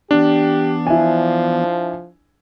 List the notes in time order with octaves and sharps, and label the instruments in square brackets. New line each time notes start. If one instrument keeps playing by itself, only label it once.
[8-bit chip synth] E3 B3 [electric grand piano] D4 [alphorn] G4
[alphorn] F3 [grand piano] E4 G#5